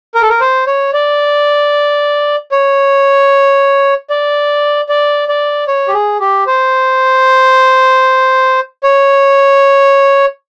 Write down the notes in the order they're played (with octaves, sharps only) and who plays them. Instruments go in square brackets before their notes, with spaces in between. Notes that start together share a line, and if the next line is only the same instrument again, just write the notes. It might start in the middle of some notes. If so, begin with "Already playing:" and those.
[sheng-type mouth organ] A#4
A4
A#4
C5
C#5
D5
C#5
D5
D5
D5
C#5
G4
G#4
G4
C5
C#5